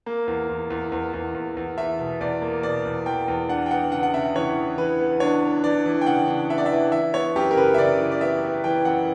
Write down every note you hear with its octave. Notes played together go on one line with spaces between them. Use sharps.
A#3
E2
E2
E2
E2
E2
E2
E2
E2 E5
B2
E2 D5
A#3
B2 D5
E2
E2 G5
E2
D4 F#5
G5
B3 F#5
C#3 F#5
F#5
C#3 E5
E3 C#5
E3
E3 B4
B3
D4 C#5
B3
E3 D5
E3
G5
C#3 F#5
D4
B3 E5
D5
E5
E3
E3 E5
B3 C#5
F#2 G4
A#4
C#3 B4
E5
C#3 D5
E3
D5
B3 E5
B3
E3 G5
F#2 F#5